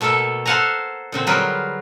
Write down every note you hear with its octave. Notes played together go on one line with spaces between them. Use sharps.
B2 A3 A#3 A4 E5
A4 C5 F5 F#5 G#5 A#5
A#2 D3 C4
F#3 G3 F4 G#4 A#4 B4